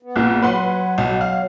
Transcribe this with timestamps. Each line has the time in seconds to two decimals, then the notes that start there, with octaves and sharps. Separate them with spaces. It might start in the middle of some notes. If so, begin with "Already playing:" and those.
0.03 B3
0.16 A#1 A#2
0.42 F#3 B4 F#5 C6
0.98 B1
1.21 F5